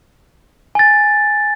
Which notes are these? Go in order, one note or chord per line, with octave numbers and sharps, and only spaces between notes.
G#5 A6